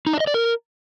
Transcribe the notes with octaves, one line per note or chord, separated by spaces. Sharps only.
D#4
D4
D#5
D5
A#4